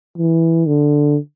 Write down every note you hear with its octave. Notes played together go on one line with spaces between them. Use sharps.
E3
D3